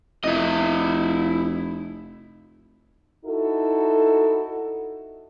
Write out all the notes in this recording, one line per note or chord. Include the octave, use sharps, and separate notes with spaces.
F1 E4 D#5
D#4 E4 F#4 A4